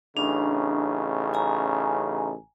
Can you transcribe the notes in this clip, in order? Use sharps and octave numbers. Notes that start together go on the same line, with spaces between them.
A1 C#3 D4 D#4
G#5 A#5